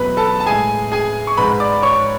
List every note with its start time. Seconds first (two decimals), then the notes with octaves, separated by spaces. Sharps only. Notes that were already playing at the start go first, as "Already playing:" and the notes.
Already playing: E2 B2 F#3 A3 B4 B5
0.17 A4 A5
0.40 A5
0.46 A2 G#3 G#4 G#5
0.92 G#4 G#5
1.27 C#6
1.37 G#2 G#3 B4 B5
1.60 D5 D6
1.83 C#5 C#6